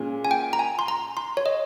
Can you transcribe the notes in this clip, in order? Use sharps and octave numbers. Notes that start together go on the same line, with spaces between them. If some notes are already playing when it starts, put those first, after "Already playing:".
Already playing: A#2 G#3 C#4
G#5
G5
A#5
G#5
C6
A#5
C6
C#5
D#5